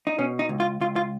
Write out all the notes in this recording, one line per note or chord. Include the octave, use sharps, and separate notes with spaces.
D#4
B2 C#4
D#4
C#2
F4
C#2 F4
F4